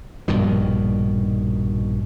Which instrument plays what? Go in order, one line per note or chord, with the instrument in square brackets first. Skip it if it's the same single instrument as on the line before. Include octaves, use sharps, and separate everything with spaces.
[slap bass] A#1 G2 B2 D#3